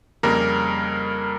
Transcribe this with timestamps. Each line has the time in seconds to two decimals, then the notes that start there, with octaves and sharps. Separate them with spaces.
0.23 F2 C#3 G3 A#3 A#4